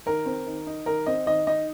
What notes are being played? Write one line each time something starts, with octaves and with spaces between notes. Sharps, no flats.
D#3 A#4
C4
D#3
D#4
D#3 A#4
C4 D#5
D#3 D#5
D#4 D#5